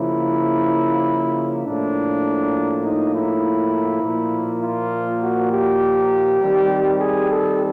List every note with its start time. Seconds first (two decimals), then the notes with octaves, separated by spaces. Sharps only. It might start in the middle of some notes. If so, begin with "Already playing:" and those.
Already playing: C#3 F3 A#3 E4
1.65 A2 F3 A#3 D4
2.83 D#4
3.13 E4
4.02 A#2 F3 A#3
4.61 F4
5.20 F#4
5.50 G4
6.40 D#3 G3 C4
6.98 G#4
7.29 A4